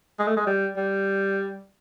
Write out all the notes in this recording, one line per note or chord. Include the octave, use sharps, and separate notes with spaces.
G#3
A3
G#3
G3
G3